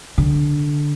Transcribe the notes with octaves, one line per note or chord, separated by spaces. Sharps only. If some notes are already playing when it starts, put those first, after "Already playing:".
D3